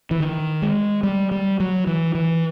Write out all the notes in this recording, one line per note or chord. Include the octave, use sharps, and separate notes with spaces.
E3
D#3
G#3
G3
G3
F#3
E3
E3